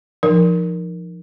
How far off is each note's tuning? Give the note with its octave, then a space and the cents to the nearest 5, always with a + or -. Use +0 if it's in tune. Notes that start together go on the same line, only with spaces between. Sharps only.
F3 -15 D#4 -20 A#4 +0